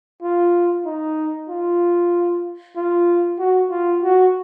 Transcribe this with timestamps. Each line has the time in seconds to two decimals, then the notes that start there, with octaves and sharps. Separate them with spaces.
0.22 F4
0.85 D#4
1.49 F4
2.76 F4
3.39 F#4
3.71 F4
4.03 F#4